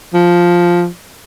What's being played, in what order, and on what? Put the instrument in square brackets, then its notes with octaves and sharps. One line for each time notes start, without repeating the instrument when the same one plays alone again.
[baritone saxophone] F3